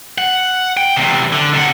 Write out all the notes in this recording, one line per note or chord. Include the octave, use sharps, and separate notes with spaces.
F#5
G5
E2 C3
D3
C3 F#5